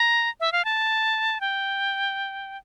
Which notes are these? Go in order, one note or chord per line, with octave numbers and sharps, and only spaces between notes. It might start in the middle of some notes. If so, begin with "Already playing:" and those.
Already playing: A#5
E5
F5
A5
G5